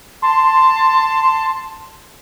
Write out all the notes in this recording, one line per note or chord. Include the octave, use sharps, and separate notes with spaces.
A5 C6